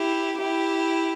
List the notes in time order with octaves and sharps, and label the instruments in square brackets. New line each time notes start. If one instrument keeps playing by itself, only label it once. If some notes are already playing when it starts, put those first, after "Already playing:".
Already playing: [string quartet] E4 G4
E4 G4